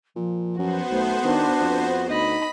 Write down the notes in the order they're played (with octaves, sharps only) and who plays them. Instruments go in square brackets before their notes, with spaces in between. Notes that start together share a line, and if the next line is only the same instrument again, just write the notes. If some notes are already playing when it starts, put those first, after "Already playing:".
[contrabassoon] A#2 [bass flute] F3
[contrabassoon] F#2 [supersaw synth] B3 C5 [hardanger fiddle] F#4
[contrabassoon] B1 [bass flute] A3
[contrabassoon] D#3 [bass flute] D4
[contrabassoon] F2
[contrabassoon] D2 [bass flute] D#4 [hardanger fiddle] D#5 B5 [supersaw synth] B6